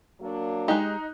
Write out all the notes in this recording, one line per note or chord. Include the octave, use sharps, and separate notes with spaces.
F#3 A#3 D4
G#3 D#4 G4 F#6